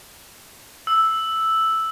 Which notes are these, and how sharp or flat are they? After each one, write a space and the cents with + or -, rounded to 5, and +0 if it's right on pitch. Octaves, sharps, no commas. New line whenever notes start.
E6 -5